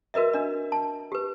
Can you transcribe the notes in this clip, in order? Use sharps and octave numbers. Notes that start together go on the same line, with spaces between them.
F#4 A#4 B4 D#5 E5
D4 D#5
A5
G4 B4